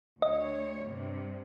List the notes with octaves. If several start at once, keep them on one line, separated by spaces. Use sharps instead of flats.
D2 C#5 D#5
G2 C3